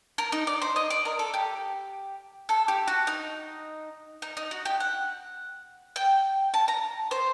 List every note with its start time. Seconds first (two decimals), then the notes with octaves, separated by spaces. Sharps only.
0.18 A#4
0.32 D#4
0.47 D5
0.62 C5
0.76 D#5
0.90 D5
1.05 A#4
1.19 A4
1.34 G4
2.49 A4
2.68 G4
2.88 F#4
3.07 D#4
4.22 D#4
4.37 D#4
4.51 F#4
4.65 G4
4.80 F#5
5.96 G5
6.54 A5
6.68 A#5
7.11 C5